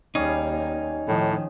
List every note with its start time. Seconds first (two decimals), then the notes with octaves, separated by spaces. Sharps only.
0.15 D#2 G3 A#3 C#4 D#4 G#4
1.08 A2 D#3 F3